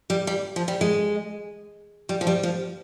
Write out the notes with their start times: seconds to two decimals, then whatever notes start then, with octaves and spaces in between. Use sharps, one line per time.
0.10 G3
0.27 G3
0.56 F3
0.68 G3
0.81 G#3
2.09 G3
2.21 F3
2.27 G3
2.43 F3